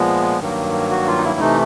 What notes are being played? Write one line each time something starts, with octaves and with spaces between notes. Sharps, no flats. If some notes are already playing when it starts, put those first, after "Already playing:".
Already playing: A#2 F3 G#3 B3
G2 D#3 F#3 A#3
F#4
F4
D#4
E4
C3 E3 A3 D#4